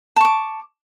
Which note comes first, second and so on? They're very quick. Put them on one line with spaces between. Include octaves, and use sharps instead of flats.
A5 C#6 D6